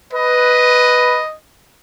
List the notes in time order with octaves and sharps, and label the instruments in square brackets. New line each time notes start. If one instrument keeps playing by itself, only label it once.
[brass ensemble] B4 [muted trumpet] D#5